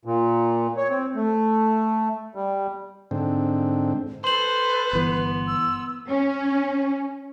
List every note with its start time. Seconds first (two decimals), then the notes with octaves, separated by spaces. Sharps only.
0.05 A#2
0.77 C#5
0.89 C4
1.15 A3
2.35 G3
3.11 G#2 D3 C4
4.24 A4 B4 C5 C6 F#7
4.93 G1 E3 B3
5.48 E6
6.08 C#4